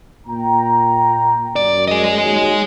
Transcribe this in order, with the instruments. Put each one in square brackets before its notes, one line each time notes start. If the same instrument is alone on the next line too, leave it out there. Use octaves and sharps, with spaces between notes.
[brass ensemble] A#2 G5 A#5
[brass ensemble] F#2 [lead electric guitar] D5
[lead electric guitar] G#4 D#5
[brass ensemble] D#2 F#3